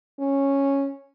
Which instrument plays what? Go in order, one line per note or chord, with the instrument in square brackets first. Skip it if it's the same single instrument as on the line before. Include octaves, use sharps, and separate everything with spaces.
[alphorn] C#4